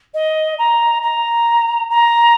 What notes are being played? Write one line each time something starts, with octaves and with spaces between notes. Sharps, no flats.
D#5
A#5
A#5
A#5